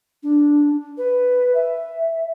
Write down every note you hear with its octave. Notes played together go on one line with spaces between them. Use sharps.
D4
B4
E5